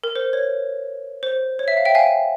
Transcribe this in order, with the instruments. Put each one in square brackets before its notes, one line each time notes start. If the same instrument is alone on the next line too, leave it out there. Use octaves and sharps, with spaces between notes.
[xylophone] A#4
C5
C#5
C5
C#5
E5
F5
E5 G5
F5 G#5